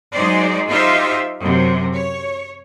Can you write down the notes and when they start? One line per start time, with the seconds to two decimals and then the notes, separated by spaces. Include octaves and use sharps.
0.12 F#3 G#3 D#4 G#4 C5 D5
0.68 D#4 F4 G4 C5 E5 F5
1.40 F#2 C3
1.93 C#5